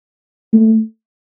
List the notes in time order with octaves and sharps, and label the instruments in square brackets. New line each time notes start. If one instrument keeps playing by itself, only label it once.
[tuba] A3